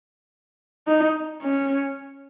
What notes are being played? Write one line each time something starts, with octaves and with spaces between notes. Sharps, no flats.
D#4
C#4